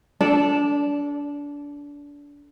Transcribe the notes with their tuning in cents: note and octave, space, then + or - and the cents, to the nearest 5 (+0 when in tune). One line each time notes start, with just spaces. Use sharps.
D4 -25 A4 +0 D5 +0